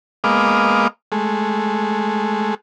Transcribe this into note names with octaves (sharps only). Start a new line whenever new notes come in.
G#3 A#3 B3 D#5 F5 D6
G#3 A3